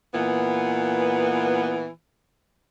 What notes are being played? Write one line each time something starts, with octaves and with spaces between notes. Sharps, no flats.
A#2 E3 B3